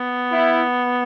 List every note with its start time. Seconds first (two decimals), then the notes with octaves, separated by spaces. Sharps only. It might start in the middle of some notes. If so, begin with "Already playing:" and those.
Already playing: B3
0.32 E4